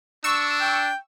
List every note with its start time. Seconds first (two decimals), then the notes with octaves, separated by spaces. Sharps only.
0.24 D4 C#6 E6
0.61 G5